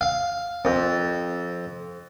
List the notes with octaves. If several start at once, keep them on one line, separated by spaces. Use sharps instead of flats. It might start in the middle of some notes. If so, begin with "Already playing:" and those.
F5
F2